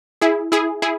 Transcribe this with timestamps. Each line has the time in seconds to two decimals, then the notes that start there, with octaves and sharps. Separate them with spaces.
0.21 E4 G#4
0.52 E4 G#4
0.82 E4 G#4